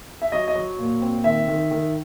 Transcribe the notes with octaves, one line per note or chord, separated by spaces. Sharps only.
E5
F#3 D#5
D#5
F#3
A#2
C4
D#3 E5
D#3
D#3